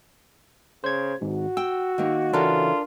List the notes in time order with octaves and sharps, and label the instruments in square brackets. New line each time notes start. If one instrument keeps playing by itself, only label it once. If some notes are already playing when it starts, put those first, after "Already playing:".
[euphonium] C#3 [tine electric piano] C5 G#6
[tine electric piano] G#1 G#2 [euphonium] F#4
[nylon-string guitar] G5 [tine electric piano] E6
[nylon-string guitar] D#3 A#3
[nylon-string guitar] C#3 E3 A4 [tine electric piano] D4 A#4 [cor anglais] F4